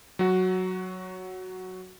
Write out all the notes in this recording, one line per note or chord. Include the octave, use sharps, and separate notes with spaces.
F#3 F#4